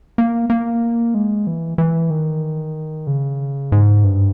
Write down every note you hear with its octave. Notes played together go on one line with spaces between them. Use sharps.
A#3
A#3
G#3
E3
E3
D#3
C#3
G#2
G2